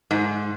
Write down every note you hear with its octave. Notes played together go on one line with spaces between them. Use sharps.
G#2